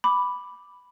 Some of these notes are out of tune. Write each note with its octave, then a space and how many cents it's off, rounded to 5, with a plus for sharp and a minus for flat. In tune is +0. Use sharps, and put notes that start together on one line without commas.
B5 +0 D6 +0